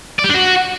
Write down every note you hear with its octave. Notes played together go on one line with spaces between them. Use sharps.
D5
G4
D4
F#4